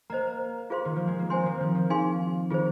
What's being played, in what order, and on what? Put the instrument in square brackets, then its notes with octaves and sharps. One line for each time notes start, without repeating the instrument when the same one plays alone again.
[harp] A#3 [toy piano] C5 D#5 A#5
[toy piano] F4 G#4 C5 F5 C6
[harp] D#3
F3
G#3
A#3
[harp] C4 [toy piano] C5 G#5 C6
[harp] F3
D#3
F3
[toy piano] D#4 G#4 F5 G#5 C6
[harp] D#3 [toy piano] F4 G#4 C5